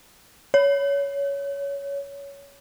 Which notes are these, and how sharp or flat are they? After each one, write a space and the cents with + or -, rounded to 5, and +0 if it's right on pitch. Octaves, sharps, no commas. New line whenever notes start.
C#5 +15